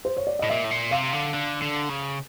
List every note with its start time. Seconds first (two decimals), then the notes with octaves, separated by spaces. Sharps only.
0.05 C5
0.17 C#5
0.27 D5
0.39 A2 D#5
0.50 A#2 E5
0.64 A2
0.70 A#2
0.91 C3 F5
1.13 D3
1.34 D3
1.62 D3
1.89 C#3